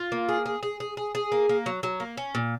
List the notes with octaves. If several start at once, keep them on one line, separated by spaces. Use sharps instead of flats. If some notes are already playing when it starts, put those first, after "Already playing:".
Already playing: F4
A#3
G#4
G#4
G#4
G#4
G#4
G#4
A#3
A#3
F#3
F#3
A#3
C#4
A#2